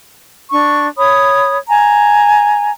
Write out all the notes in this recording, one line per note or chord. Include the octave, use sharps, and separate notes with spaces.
D4 C#6
C#5 B5 D#6
G#5 A#5